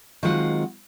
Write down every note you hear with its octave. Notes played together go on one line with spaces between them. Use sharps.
D#3 F#3 G#3 C4 F4 F#5